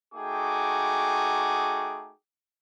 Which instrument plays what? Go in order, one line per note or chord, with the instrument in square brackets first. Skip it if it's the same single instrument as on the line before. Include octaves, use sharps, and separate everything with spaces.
[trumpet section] A3 D#4 F#4 G#4 G5 D6